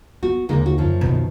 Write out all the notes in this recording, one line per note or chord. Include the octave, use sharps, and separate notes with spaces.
B3 F#4
D#2 D3 G#3 A#3 D#4
F#4
F#2 F3
B2 D#3